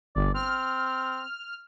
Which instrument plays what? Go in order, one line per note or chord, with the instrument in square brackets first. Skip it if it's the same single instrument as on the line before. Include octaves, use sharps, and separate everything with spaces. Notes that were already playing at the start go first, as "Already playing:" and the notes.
[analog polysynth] G1 [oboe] D5
[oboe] C4 [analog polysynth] F6